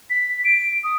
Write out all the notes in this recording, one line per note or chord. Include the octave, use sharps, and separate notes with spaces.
B6
D7
D#6